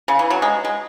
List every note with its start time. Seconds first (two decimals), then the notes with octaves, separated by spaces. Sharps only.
0.08 C#3
0.19 E3
0.30 F#3
0.42 G#3
0.65 G#3